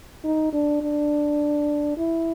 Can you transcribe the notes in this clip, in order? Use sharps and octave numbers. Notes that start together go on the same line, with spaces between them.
D#4
D4
D4
E4